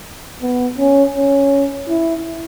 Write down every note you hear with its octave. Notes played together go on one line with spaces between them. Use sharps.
B3
C#4
C#4
E4